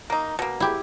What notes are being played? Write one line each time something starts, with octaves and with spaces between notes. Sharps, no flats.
A#3 D#4
B2 A#3
E4 G4